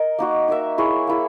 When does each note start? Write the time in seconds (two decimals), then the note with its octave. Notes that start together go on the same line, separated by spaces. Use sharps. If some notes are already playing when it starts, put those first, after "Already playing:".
Already playing: A#4 D#5
0.19 A#3 D#4 F#4
0.48 D#4 A#4 E5
0.78 E4 G#4 C#5
1.07 A#3 E4 G#4